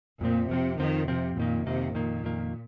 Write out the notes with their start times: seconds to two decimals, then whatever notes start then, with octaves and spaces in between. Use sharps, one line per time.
0.21 F2 A#2 F3 C4
0.49 F2 C3 F3 C4
0.79 F2 D#3 F3 C4
1.08 F2 C3 F3 C4
1.37 F2 A#2 D#3 A#3
1.66 F2 C3 D#3 A#3
1.94 F2 A#2 D#3 A#3
2.24 F2 D#3 A#3